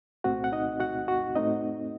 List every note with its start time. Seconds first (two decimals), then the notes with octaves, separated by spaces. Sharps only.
0.24 C2 A#2 A3 C4 F#4 F#5
0.44 F#5
0.52 D#4 D#5
0.80 F#4 F#5
1.08 F#4 F#5
1.35 A2 A3 C4 D#4 D#5